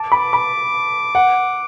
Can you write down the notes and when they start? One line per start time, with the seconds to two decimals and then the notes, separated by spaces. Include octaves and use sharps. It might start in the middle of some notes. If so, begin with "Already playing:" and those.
Already playing: A5 D6
0.12 B5
0.33 B5
1.15 F#5